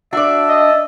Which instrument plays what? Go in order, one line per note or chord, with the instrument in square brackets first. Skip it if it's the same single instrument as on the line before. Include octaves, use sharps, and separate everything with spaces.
[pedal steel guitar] D4 [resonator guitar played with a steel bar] F#4 D5 [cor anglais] E5
[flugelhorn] D#5